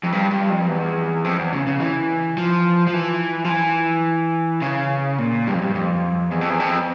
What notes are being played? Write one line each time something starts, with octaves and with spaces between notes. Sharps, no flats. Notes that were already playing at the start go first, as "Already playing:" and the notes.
F2
G2
G2
F2
E2
F2
E2
C#3
C#3
E3
F3
F3
E3
F3
E3
C#3
A#2
G2
F2
G2
F2
E2
F2
E2
F2